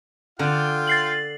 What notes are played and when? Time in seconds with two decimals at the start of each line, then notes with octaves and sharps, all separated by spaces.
0.39 D3 F4 D5 F5 G5
0.87 A6 C7 F#7